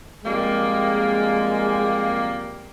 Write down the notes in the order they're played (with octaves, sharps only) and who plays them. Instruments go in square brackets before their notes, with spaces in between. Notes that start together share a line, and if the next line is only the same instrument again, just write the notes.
[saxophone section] F2 G3 A#3 [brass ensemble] G#3